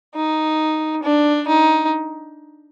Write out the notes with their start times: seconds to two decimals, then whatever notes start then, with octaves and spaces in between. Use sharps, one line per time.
0.15 D#4
1.03 D4
1.48 D#4